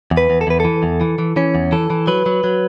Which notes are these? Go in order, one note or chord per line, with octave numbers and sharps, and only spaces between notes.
E2
B4
E2
A4
E2 B4
E3 A4
E2
E3
E3
E3 C#4
E2
E3 A4
E3
F#3 B4
F#3
F#3